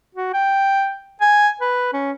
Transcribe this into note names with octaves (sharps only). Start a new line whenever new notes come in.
F#4
G5
G#5
B4
C#4